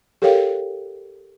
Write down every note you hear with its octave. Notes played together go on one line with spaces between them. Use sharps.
G4 A4 A#4 C#5 F5 G5